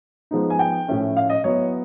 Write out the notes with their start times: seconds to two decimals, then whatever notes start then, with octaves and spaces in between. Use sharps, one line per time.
0.31 F3 G#3 B3 D#4
0.50 G#5
0.59 G5
0.88 A2 F3 A3 C#4
1.17 F5
1.29 D#5
1.44 F#3 B3 E4 C#5